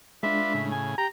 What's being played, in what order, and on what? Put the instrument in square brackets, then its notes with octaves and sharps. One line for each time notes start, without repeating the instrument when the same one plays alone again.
[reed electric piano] G#3 D4 [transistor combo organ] F4 B4 D5 [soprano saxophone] E5
[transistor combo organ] A2 C#3
[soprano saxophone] G#5
[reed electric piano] G4 [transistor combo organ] G5 [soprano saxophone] A#5